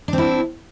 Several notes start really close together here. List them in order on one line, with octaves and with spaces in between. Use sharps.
D4 C4 E4